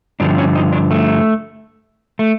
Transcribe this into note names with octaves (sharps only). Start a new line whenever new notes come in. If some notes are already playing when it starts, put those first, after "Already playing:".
G2 D3 F3 D4
C#4
D#4
D4
A3
A3